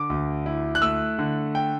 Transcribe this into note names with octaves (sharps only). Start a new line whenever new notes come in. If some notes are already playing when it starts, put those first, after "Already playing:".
Already playing: D3 D6
D2
E4
F#6
A3 E6
D3
G5